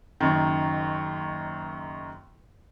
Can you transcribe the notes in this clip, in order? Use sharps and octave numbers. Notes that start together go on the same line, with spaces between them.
F#1 F#2 D#3